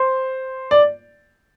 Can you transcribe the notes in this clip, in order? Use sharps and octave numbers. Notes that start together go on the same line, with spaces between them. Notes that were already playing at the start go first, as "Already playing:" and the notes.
Already playing: C5
D5